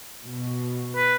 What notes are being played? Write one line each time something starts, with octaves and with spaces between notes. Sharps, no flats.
B2
B4